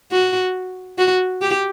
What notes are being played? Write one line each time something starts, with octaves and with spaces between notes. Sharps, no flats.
F#4
F#4
G4